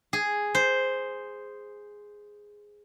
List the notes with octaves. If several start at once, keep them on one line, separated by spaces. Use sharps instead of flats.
G#4
C5